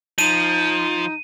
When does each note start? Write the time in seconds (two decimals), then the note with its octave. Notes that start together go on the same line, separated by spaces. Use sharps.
0.18 F3 D#4 D#7